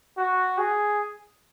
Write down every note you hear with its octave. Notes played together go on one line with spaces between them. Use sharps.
F#4
G#4